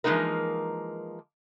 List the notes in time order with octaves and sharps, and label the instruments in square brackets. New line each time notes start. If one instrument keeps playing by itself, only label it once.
[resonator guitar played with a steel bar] E3 F3 G#3 A#3 D#4 A#4